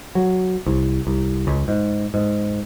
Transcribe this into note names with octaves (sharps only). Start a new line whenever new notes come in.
F#3
C2
C2
C#2
G#2
G#2